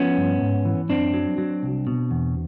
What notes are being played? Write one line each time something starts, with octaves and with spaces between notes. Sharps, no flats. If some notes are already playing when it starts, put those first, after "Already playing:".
Already playing: F3 B3 C#4
G2
G#2
E3
F#2 C4 D4
F#3
F#3
C2
B2
E2